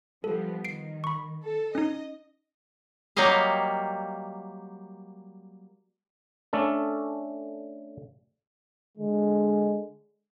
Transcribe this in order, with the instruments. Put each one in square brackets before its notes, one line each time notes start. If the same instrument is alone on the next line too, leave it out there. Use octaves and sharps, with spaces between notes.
[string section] F3 G3 B3 [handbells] A4
[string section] D#3 [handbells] C7 D7
[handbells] B5 C#6
[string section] A4
[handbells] C#4 D#4 [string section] D#5
[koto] F#3 G3 A#3 D#5 F5
[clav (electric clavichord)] A3 C#4 D4 A4
[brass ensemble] D3 G#3